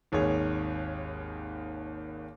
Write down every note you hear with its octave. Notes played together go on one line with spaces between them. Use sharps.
G#1 D#2 G#4 C#5